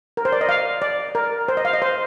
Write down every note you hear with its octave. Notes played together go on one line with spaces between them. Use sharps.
A#4
C5
D5
D#5
F5
D5
A#4
C5
D#5
F5
D#5
C5